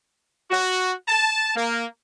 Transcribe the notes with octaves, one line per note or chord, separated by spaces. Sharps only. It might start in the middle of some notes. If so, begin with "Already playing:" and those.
F#4
A5
A#3